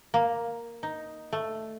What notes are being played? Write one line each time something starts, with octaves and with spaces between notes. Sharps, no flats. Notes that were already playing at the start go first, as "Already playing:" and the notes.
A#3
D#4
A3